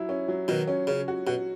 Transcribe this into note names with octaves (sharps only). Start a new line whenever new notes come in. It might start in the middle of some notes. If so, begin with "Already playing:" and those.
Already playing: F#3 E4
C#4
F#3
B2 D#3 F#3
C#4
C#3 C#4
F#4
B2 F#4